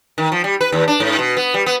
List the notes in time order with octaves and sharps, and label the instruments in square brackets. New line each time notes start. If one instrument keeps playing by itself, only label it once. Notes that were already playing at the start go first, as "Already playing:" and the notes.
[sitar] D#3
F3
G3
B4
D#2
D4
G#2
B2
B3
G3
B3